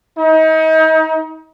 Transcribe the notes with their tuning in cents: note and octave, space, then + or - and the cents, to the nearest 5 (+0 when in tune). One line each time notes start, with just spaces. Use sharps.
D#4 +35